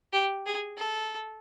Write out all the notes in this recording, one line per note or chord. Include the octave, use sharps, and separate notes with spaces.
G4
G#4
A4